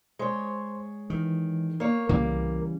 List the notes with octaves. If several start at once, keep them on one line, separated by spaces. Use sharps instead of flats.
G#3 C5 C#5 C6
D#3 E3
A#3 C#5
C2 C#3 E3 G3 A#3